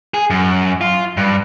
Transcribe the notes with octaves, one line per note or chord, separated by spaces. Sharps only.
G#4
F#2
F4
G2